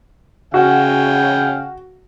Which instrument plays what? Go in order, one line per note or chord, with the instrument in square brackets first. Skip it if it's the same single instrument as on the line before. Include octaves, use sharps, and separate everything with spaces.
[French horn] C#3 [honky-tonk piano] F#4 [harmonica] F5 G5 G#5